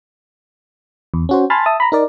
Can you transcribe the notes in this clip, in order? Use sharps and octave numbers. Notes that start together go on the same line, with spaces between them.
E2
C#4 F#4 C5
G#5 A5 B5 C6 F6 A6
E5 A5 D#6
A#5 B5
D#4 A#4 D5